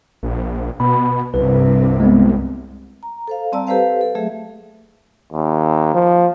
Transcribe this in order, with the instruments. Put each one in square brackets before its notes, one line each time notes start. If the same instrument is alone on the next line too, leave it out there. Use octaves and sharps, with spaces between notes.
[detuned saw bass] A#1
[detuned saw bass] B2 [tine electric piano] B5
[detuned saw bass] C2 [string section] G2 C3 [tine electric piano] B4
[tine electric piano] G#3 B3 C4
[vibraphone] A#5
A4 C5 F5
G3 C4 D5 A5 A#5 E6
G4 A4 B4 C5 F5 G5
A4
F#3 A3 G#4 E5
[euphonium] D#2
F3